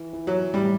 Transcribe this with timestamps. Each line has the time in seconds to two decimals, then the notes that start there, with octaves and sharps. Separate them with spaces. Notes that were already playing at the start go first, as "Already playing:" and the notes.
Already playing: E3
0.13 E3
0.27 F#3
0.54 A2 G3